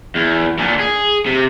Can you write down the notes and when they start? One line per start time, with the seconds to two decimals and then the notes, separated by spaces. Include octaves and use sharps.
0.15 E2
0.59 A#2 D3
0.79 G#4
1.26 C3